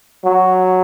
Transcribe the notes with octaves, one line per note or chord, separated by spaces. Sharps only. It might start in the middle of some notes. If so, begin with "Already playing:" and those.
F#3